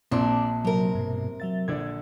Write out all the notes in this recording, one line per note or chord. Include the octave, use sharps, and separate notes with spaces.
A#1 A#2 C4 D4 D5 C6 D6
C3 F#3 A#4
G2 B2
F#3 E5 A6
A#1 D3 D5 G#6